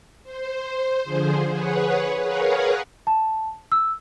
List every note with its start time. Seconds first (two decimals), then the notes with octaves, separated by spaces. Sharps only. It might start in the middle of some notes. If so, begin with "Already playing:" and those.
0.23 C5
1.04 D3 F3 G#4 C5
1.51 G#4 B4 C#5 F#5
2.21 G#4 A#4 B4 C#5 F5 F#5
3.07 A5
3.72 E6